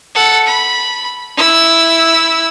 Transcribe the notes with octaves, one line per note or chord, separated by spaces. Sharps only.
A4 F#5
B5
E4 E6